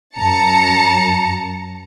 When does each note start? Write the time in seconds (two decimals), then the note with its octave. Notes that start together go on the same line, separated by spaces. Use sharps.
0.17 F#2 A5 A#5 C#7